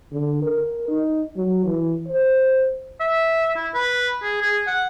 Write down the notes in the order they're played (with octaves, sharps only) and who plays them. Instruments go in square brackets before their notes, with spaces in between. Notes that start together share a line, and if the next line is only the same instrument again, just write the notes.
[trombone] D3
A#4
D#4
F#3
E3
C5
[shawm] E5
E4
B4
G#4
G#4
F#5